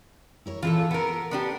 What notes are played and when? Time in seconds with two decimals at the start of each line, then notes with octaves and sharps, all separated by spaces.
0.46 E4 A#4 C#5
0.63 A#2 E3 F4 G#4 A4
0.91 B3 A4 A#4
1.31 B3 D4 G4